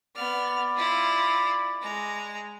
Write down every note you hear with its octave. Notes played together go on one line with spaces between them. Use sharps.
B3 D5 B5 F6
E4 F4
G#3 A#5